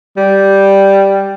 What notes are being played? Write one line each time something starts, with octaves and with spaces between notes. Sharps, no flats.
G3